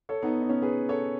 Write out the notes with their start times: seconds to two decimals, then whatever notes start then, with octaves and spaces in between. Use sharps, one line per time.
0.09 A4 C#5
0.22 B3 D#4
0.42 D#4
0.49 C#4
0.62 G#4 B4
0.89 A4 C#5